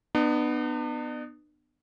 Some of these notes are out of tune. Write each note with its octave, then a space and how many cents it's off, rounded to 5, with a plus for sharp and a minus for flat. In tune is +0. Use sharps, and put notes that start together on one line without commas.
B3 +0 D4 +45